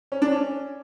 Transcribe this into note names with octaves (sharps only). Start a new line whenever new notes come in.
C#4
D4
C#4